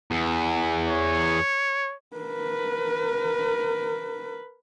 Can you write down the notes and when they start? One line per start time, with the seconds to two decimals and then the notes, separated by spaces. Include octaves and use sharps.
0.11 E2
0.88 C#5
2.17 A#4 B4